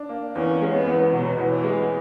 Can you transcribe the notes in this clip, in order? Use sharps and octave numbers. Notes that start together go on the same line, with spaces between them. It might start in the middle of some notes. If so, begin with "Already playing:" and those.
Already playing: D4
A#3
E2 C#4
G#3
B3
E2
B2 F#3
E2
E3
G#3